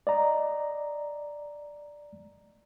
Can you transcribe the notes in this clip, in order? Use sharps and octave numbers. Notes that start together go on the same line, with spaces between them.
D5 D#5 A#5